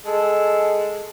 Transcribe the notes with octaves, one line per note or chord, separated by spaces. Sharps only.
G#3 A4